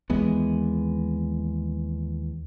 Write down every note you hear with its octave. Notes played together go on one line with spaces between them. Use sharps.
D#2 E3 G#3 B3